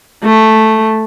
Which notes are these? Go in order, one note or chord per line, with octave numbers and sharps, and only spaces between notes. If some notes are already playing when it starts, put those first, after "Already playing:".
A3